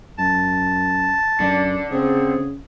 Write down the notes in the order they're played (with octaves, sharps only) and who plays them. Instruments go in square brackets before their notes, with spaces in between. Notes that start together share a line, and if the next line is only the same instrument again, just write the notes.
[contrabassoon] F#2 [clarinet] A5
[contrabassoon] F#2 [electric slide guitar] D3 [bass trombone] D4
[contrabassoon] C#3 [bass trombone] C4 [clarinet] G#4